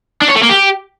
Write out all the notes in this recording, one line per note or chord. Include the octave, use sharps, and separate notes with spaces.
D4
C#5
A3
A#3
G4